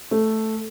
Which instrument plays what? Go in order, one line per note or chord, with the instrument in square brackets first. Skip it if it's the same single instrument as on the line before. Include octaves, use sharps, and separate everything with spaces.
[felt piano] A3